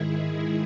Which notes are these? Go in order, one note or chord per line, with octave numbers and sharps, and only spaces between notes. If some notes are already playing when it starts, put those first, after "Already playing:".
Already playing: G#2 D#3 G#3 E4 G#4